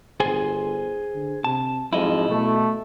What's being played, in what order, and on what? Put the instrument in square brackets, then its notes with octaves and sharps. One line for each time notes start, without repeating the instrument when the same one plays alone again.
[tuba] G1 [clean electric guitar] G#4 C5 G#5
[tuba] D3
[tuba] C3 [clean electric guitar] A5
[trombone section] F2 G#2 [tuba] F#3 [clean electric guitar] E4 D#5
[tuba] B2 [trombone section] A3